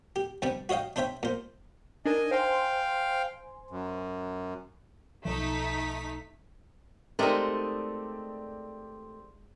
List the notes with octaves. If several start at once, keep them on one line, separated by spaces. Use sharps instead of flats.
G4
G2 C3 G3 D6
F#4 C#5 D#5 F5 G5
D4 C5 C#5 E5 G5
A#2 C5
D4 D#4 A#4 D#5 G#5
C5 F5 G5 G#5 C6
F#2
B1 F3 A3 D#4 B6
G#3 A3 C4 D#4 G4 A#4 D5